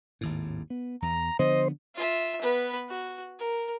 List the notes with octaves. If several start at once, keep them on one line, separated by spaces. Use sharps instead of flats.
G#1 D#2 A2
B3
E2 A#5
D3 F3 B3 C5 D#5
F4 E5
B3 B4
F#4
A#4